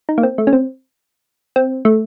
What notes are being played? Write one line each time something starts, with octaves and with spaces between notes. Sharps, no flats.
D#4
A#3
C4
A3
C#4
C4
C4
A3